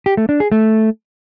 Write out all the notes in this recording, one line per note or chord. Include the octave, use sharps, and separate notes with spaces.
G4
A3
D4
G#4
A3